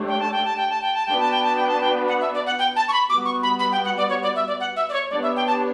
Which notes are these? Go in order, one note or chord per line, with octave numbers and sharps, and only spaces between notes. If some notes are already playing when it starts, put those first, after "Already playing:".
Already playing: A3 D4 G4 C#5
G5
A5
G5
A5
G5
A5
G5
A5
B3 D4 F#4 B4 G5
A5
G5
A5
G5
A5
G5
F#5
E5
D5
F#5
G5
A5
C#6
B5
G3 B3 F#4 D6
C#6
B5
B5
G5
F#5
D5
C#5
D5
E5
D5
F#5
E5
D5
C#5
B3 D4 G4 C#5 D5
E5
G5
A5